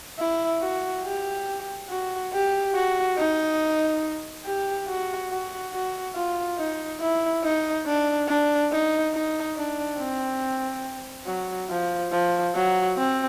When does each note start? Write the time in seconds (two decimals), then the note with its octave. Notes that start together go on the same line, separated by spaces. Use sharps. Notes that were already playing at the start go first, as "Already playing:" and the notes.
0.19 E4
0.61 F#4
1.04 G4
1.90 F#4
2.33 G4
2.75 F#4
3.17 D#4
4.45 G4
4.88 F#4
5.30 F#4
5.73 F#4
6.16 F4
6.58 D#4
7.01 E4
7.44 D#4
7.86 D4
8.29 D4
8.72 D#4
9.14 D#4
9.57 D4
9.99 C4
11.26 F#3
11.70 F3
12.12 F3
12.55 F#3
12.97 C4